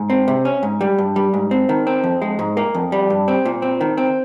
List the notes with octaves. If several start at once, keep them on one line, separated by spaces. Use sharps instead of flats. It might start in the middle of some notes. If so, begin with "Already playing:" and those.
Already playing: G#2
C4
C3
C#4
G#2
G3
G2
G3
G#2
C4
D#3
C4
F2
G#3
G#2
A#3
F2
G3
G2
C4
A#2
C4
D#3
C4